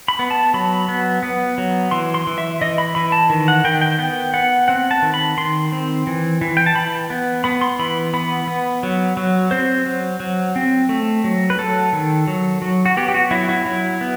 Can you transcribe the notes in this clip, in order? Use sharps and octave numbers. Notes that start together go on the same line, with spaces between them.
B5
B3
A5
F#3 B5
B3
B3
F#3
E3 C6
C6
E3
E5
E3 D#5
B5
E3 B5
A5
D#3
F#5
D#3 G5
G5
B3 G5
B3 F#5
C4 F#5
A5
D#3
B5
D#3 C6
C4
E3
E3
G5
A5
E3 B5
B3
B3 B5
C6
E3 B5
B3 B5
B3
F#3
F#3
C4 C5
F#3
F#3
C4
A3
F#3
B4
F#3 A4
D#3
F#3
F#3
F#4
B3 G4
G4
F#4
F#3 E4
E4
F#3 E4
B3